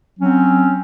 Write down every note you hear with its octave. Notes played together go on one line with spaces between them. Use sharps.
F#3 C4 C#4